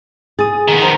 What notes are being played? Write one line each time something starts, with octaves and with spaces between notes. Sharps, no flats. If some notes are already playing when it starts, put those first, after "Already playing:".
G#4 D#6 A6
D#3 B3
A#4 C5 A#5